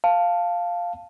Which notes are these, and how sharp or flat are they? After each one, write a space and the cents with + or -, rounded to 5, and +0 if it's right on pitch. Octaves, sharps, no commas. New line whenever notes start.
F5 +0 A5 +0